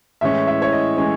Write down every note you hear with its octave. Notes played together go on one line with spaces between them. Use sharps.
A2 E3 G#3 C#4 E5
E5
C#5
D#5
A2 E3 G#3 C#4